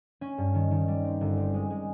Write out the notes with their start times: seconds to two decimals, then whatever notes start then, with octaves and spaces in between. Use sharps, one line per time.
0.21 C#4
0.38 G2
0.54 D#3
0.71 D#3
0.88 G3
1.04 C4
1.21 G1
1.37 C4
1.54 G#3
1.70 G#3